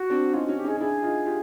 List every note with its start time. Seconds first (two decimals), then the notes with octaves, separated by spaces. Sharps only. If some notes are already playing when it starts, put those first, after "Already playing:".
Already playing: F#4
0.10 C4 D4
0.33 C#4 D#4 F4
0.45 C#4 F#4
0.57 G4
0.64 C#4 D#4
0.68 G#4
0.80 D4 E4 G#4
1.03 D#4 F4
1.26 F4 G4